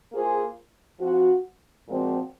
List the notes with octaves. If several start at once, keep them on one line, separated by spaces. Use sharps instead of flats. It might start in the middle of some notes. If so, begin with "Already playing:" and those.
A#3 F4 G#4 C5
F3 C4 F#4
A#2 F3 G#3 C4 F#4